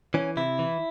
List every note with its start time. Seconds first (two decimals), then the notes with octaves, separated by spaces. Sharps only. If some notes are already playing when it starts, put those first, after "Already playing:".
0.14 E3 C#4
0.37 C3 E4
0.59 E3